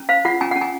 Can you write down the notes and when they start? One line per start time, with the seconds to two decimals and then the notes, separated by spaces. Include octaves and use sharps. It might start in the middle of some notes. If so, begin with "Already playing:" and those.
Already playing: C#4
0.09 C5 F5
0.25 F4 F#5
0.41 C#4 G#5
0.51 C#4 F#5
0.61 G#5